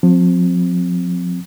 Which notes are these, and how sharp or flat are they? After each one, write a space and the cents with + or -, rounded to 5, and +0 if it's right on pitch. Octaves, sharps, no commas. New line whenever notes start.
F3 +35 C4 +0